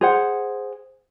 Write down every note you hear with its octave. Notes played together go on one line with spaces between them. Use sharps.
G#4 C5 F#5